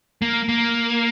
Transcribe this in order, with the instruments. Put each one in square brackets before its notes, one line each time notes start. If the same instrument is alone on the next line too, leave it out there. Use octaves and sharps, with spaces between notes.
[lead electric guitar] A#3
A#3